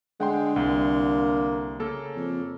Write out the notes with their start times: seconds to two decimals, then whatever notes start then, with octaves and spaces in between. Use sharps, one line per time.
0.20 D3 G#3 F#5 G5 C6
0.56 C2 A#3
1.80 C#3 A#3 A4
2.16 F2